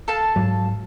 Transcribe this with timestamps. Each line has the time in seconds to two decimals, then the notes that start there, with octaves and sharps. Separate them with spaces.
0.08 A4 F5 A5
0.36 G#2 F#3